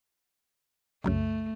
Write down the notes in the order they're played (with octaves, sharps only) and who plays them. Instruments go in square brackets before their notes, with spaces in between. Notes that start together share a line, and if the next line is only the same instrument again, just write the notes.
[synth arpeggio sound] C2 F#2 C#3 [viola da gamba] A3